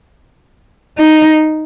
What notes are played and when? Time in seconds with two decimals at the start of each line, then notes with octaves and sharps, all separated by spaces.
0.98 D#4